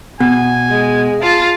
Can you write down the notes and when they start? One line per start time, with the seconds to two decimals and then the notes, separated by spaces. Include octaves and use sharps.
0.20 B2 G#5
0.71 G#3
1.23 F4 A5